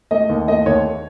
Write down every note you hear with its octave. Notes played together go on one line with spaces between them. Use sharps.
A3 D#5
D#2
A3 D#5
D#2 C#5